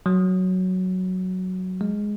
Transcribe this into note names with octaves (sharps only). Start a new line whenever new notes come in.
F#3
G#3